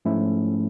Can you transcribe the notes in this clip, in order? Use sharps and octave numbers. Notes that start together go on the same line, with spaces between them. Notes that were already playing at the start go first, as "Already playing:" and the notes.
G#2 F3 A3 C#4 E4